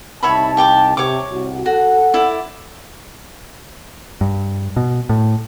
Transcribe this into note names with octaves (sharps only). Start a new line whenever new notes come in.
C2 D#4 C#5 E5 A5 B5
G4 G5 D6
C3 C#5 D6
C2 F#4
F#4 A4 F#5
E4 D5
G2
B2
A2